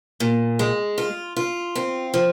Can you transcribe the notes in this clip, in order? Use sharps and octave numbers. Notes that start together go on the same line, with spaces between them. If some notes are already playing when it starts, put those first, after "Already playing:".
A#2
G#3
F4
F4
C4
F3